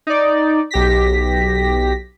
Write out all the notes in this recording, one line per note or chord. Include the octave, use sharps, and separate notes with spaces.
D#4 D5
B1 G4 A#6 B6